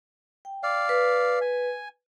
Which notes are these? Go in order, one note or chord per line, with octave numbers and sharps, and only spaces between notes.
G5
D5 F5
B4
G#5